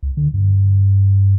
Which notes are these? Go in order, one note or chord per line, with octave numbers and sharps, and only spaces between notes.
C#2
D3
G2